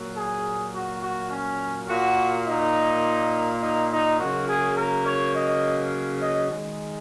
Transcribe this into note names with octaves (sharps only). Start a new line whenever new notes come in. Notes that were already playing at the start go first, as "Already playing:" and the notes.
Already playing: A#2 F#3 A#3
G#4
F#4
F#4
C#4
A#2 A#3 F#4
D#4
D#4
D#4
C#3 F#3 A#3 F#4
G#4
A#4
C#5
D#5
D#5
D#3 G#3